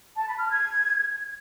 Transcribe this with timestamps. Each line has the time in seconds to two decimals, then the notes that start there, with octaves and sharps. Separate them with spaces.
0.17 A5
0.28 B5
0.39 F6
0.50 G#6